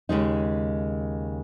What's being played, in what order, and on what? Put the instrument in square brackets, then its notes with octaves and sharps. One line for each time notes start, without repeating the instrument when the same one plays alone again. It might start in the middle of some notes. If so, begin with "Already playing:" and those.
[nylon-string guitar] D#2 C#3 G#3 D#4